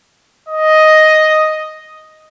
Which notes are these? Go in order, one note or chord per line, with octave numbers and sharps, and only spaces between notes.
D#5